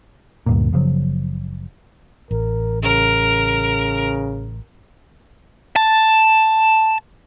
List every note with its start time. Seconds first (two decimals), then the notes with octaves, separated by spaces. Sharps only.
0.46 D2 G2 A#2
0.72 F#1 C#3 F3 F#3
2.31 A1 A#4
2.83 C#3 A#4
5.76 A5